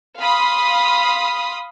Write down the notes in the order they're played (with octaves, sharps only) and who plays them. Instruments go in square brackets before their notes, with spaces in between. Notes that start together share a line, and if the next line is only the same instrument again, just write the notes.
[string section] F5 B5 C6 D#6